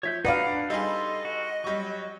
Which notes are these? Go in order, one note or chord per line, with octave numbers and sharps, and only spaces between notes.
F3 C#5 E5 G6
D4 D#4 F#4 B4 D5 F5 F#5
D4
G3 D#4 G#4 A4 D#5 C6
F#4
F#3 G3 C#6